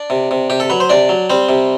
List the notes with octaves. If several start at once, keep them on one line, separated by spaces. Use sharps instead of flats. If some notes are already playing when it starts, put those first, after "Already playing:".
Already playing: D4 D5
C3
C3
C3 G4
A4
F#3 B4
C5
C3 D4 D5
F#3
G3 C4 C5
C3